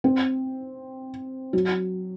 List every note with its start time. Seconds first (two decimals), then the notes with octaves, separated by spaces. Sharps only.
0.04 C4
1.53 F#3